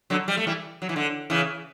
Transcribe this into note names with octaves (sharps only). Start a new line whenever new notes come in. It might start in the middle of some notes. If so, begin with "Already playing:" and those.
D3 F#3
G3
A3
E3 G3
F#3
E3
D3
C#3 E3